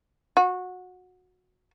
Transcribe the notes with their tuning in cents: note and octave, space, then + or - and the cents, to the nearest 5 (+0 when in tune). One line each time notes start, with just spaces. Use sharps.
F#4 -20